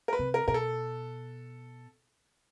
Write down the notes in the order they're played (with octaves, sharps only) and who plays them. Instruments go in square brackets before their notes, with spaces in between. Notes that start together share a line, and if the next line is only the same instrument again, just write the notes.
[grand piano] A#4
B4
[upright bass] C3
[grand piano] A#4
[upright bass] B2 [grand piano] A#4
[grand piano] A4